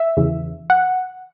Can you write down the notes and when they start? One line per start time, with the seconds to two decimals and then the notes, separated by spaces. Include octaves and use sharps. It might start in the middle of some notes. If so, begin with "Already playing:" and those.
Already playing: E5
0.17 E2 C#3 E3
0.70 F#5